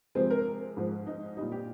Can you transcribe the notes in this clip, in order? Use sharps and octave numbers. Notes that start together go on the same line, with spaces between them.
C3 F3 G#3 C4
A#4
G#2 F3 G#3
D#4
A#2 G3 D#4
G4